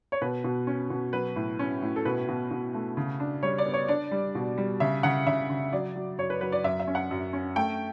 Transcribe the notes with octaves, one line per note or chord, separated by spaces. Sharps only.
C#5
B2 B4
B2
C#4
B2
F#3 B4
A2
C#4
A2
A4
B2 B4
B2
B2
A3
C#3
D4
G3 C#5
D5
B3
C#5
D4 D5
G3
B2
G3
C#3 E5
C#3 F#5
C#3 E5
C#3
F#3 D5
F#3
F#2 C#5
B4
F#3 B4
D5
F#2 E5
E5
C#4
F#5
F#2
C#4
A3 G5